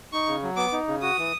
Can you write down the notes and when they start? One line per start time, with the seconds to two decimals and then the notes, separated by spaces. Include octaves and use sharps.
0.13 D#4 C#6
0.27 C#3
0.43 F#3
0.57 B3 D6
0.72 D#4
0.88 C#3
1.02 F#4 D#6
1.18 E3